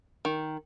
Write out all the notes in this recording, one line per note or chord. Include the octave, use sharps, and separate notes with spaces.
D#3